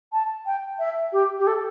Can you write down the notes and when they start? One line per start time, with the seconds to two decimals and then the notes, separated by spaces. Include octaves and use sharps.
0.12 A5
0.46 G5
0.79 E5
1.13 G4
1.39 G4
1.47 A4